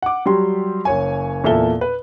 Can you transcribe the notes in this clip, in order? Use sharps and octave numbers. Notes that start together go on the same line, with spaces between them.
F#5 D6
F#3 G3 G4 C6
F#1 C#5 G#5
E2 A#2 A4 E5 G7
B4